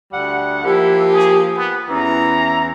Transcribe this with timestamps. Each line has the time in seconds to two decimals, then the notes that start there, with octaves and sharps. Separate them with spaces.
0.12 D2 G3 F#5
0.64 F3 A#3 E4 G4
1.12 G#4
1.56 B3
1.89 E2 E3 C#4 A#5